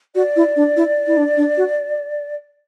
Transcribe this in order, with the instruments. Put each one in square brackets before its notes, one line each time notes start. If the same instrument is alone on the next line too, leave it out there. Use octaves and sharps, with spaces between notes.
[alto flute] F#4 [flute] D5
[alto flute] E4
D4
E4
E4
D4
D4
F#4